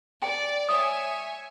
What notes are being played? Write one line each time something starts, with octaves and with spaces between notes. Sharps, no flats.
D5 G5
C#5 E5 G#5 D#6